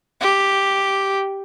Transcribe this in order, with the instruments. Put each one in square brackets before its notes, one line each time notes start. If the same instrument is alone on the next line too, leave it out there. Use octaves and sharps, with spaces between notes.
[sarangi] G4